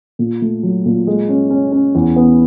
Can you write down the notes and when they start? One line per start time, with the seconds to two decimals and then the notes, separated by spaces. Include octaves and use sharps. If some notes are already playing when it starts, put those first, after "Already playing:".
0.19 A#2
0.42 A3
0.63 F#3
0.86 A#2
1.07 G#3
1.29 C#4
1.50 C#4
1.72 C#4
1.95 E2
2.16 B3